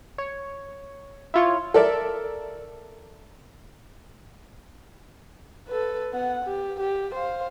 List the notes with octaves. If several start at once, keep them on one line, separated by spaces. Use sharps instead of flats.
C#5
E4 F4 C#5
A4 A#4 D5 E5
A4 B4
B3 F#5
G4
G4
C5 F5